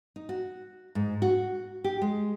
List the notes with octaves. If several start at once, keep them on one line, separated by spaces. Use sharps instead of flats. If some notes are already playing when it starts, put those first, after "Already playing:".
D#4
F#4
G#2
F#4
G4
G#3